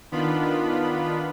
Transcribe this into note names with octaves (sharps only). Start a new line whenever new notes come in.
D#3 B3 D4 F4 B5